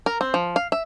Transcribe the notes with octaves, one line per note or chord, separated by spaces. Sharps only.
A#4
C4
F3
F5
E5